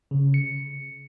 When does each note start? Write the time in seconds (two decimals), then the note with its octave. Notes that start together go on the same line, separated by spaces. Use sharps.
0.11 C#3
0.34 C#7